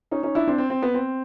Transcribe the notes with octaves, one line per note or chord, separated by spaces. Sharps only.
C#4 D#4
C#4 D#4
D4 E4
C4 D4
C4
C4
B3
C4